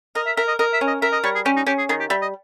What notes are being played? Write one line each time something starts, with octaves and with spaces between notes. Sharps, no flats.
A#4 D#5
E5
A#4 E5
D#5
A#4 D#5
E5
C#4
D#5
A#4 E5
D#5
G3 C#5
G#4
C#4 G4
D#4
C#4 G4
G#4
D#3 G#4
G4
G3 E5
D#5